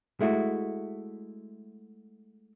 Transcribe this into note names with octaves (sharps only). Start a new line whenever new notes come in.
G#3 A3 E4 F#4